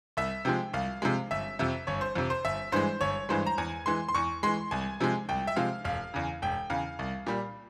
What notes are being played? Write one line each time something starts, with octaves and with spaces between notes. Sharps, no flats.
C2 E5
C3 F3 G#3 G5
C2 F5
C3 F3 G#3
G1 E5
F2 C3 E5
G1 C#5
C5
F2 C3
C5
G1 E5
G2 E3 G#3 C5
G1 C#5
G2 E3 G#3 C5
A#5
E2 G#5
E3 G#3 C6
C6
E2 C#6
E3 G#3 C6
C2 G#5
C3 F3 G#3
C2 G5
E5
C3 F3 G#3 F5
E1 F5
E2 C#3
E1 G5
E2 C#3 F5
C2
A#2 G3